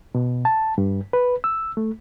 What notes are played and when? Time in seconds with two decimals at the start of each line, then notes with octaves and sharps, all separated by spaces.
0.15 B2
0.45 A5
0.78 G2
1.13 B4
1.44 E6
1.77 A3